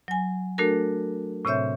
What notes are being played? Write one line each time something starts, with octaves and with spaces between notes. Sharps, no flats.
F#3 G#5
A3 D4 F#4 A4 A#4
A2 C3 C4 C#5 E5 G6